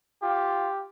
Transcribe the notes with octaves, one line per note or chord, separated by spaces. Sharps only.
F4 G4